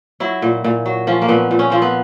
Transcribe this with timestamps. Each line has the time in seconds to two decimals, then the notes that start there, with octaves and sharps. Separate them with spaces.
0.20 F#3 E4
0.42 A#2
0.64 A#2
0.86 F#3
1.07 F3 C#4
1.22 A#3
1.28 A#2 B3
1.51 A#2
1.59 C#4
1.70 F3 C4
1.82 B3